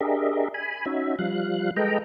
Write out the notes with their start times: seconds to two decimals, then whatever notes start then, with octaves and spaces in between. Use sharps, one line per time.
0.01 D4 G4 G#4 A#4 D#5 E5
0.54 G#5 B5
0.86 C#4 D#4 F#4 E5
1.19 F3 G3 F5 F#6
1.76 G#3 A4 B4 D#5 G5 A#5